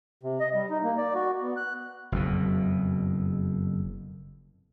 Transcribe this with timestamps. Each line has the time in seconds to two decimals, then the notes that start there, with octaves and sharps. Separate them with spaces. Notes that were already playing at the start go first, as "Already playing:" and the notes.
0.23 C3
0.40 D#5
0.54 G3
0.70 D#4
0.84 A#3
0.97 D5
1.15 F#4
1.42 B3
1.57 F#6
2.12 F#1 F2 B2